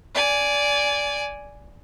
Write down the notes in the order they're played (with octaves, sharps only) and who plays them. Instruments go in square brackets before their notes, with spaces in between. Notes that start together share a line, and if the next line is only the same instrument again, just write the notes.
[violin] D5 G#5